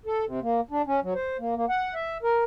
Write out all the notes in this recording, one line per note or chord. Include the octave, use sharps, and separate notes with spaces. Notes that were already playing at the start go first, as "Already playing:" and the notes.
A4
C3
A#3
D4
C#4
F#3
C5
A#3
A#3
F#5
E5
A#4